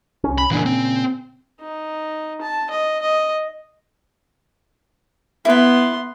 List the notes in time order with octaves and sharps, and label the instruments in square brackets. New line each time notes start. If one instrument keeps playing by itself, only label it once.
[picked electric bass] C2 C#4
[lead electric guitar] B5
[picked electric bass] A#2 C#3 [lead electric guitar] E3 D4
[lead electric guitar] C4
[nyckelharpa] D#4
A5
D#5
D#5
[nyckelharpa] B3 C6 [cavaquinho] E4 B4